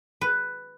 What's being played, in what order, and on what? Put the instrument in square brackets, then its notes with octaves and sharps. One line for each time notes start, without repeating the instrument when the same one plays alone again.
[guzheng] B4